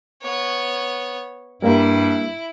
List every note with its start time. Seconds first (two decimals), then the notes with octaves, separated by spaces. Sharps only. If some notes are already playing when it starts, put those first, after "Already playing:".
0.22 B3 C#5
1.62 G2 G3 A#3 E4